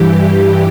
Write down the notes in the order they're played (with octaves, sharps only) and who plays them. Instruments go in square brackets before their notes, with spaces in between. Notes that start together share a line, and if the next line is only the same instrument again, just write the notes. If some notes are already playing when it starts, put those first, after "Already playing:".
Already playing: [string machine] G2 E3 G4